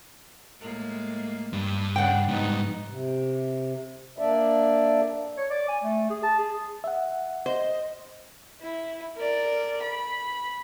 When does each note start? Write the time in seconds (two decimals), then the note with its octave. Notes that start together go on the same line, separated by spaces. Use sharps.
0.60 A2 G#3 A#3
1.53 G2
1.96 C#3 D4 F#5 G5
2.29 G#2 G3 B3 D#4
2.88 C3
4.18 A#3 D4 D5 E5
5.37 C#5
5.50 D5
5.68 G#5
5.84 A3
6.10 G#4
6.23 A5
6.39 G#4
6.84 E5 F#5
7.46 C5 D#5
8.61 E4
9.16 A#4 D5
9.82 B5